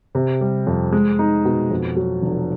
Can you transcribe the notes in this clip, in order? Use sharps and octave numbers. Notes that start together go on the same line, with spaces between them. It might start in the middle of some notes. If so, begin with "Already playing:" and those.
C3
G3
F2
G#3
D#4
B2
F2
F#3
F1